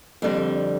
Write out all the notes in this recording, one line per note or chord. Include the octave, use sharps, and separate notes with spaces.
F2 D3 G3